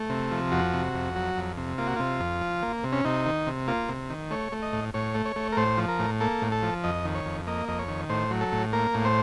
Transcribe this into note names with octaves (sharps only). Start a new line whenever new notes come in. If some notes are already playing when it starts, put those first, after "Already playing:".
Already playing: A3
C3
F3
F2 F#4
C3
F2
F#3
F2
C3
A#3 F4
F#4
C3 F4
F2
F3
A#3
C3
C#4
C3 D#4
D#3
C3
A#3 F4
C3
D#3
A3 C#5
A3
D#5
A2
A2 C#5
A3
C#5
A3
A#4
A2 C5
F3
A#4
A2
A#3 A4
A2
A4
F3
F2 D#5
D#3
C#5
F2
A#3 D#5
F2 D#5
C#5
D#3
A2 C5
F#3
A4
A2
A#3 A#4
A2
C5